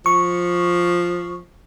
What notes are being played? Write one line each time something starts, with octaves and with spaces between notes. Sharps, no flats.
F3 C#6